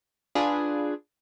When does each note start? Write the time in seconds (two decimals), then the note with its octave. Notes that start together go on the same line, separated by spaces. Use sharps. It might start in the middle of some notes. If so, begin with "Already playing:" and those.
0.35 D4 F4 G#4 B4